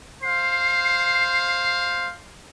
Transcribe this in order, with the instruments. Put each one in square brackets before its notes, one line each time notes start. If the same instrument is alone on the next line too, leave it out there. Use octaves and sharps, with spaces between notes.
[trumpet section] C5 F5 [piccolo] C7